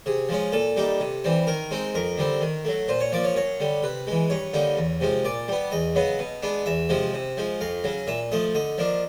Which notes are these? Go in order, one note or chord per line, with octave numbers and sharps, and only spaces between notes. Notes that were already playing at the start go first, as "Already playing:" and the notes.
C3 G#4
F3 G#3 C#4
A#2 A4
G3 A#3 D#4
C3
E3 G3 C4
D#3 A#4
G#3 C4 D#4
F2 A#4
D3 G3 C4
D#3
F#3 A3
A#2 C5
C#5
F3 A#3 D5
C#5
F#2 C#5
D3 G3
C3 B4
E3 G#3
G2 C#5
D3 G3 A#3 D#4
E2
C3 F3 G#3
A#2 D5
G3 B3
E2 D#5
C#3 F#3 B3
B2
G#3 B3 D4
E2 E5
C3 F3 G#3
C3
F3 G#3
F2 F5
C#3 F#3
A#2 E5
F3 A3 D#5
D3 D#5
F3 A#3 D4